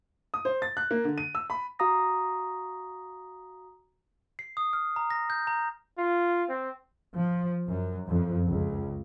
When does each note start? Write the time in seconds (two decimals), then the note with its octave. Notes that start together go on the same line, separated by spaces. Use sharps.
0.34 D#6
0.45 C5
0.62 A6
0.77 F#6
0.91 A#3
1.04 D3
1.18 D#7
1.35 E6
1.50 B5
1.79 F#4 F5 A#5 D#6 A#6
4.39 C7
4.57 D#6
4.73 F6
4.96 A#5
5.10 A#6
5.30 G6
5.47 A#5
5.98 F4
6.49 C4
7.16 F3
7.67 F#2
8.07 F2
8.48 C#2